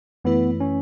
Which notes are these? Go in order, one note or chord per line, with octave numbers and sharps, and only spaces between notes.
F#2 E3 A3 B3 E4 B4
C#4